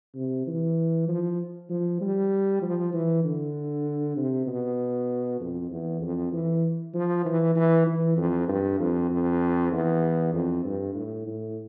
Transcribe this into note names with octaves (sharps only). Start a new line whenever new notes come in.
C3
E3
F3
F3
G3
F3
E3
D3
C3
B2
F2
E2
F2
E3
F3
E3
E3
E3
F2
G2
F2
F2
E2
F2
G2
A2
A2